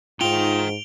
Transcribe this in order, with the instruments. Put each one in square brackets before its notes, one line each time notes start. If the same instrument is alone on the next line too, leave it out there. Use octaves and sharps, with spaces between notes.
[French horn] G#2 [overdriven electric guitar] D#4 G5 [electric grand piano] F4 [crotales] D7 F7 G7